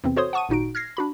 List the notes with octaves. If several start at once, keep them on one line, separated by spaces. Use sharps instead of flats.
E2 C3 E3 C4
F#4 A4 C5 C#5 C6 D#6
F#5 A5 C#6 D#6 D#7
G#1 A#2 D#4 F#4 D7
F6 G#6 A#6 C7
D4 F#4 B5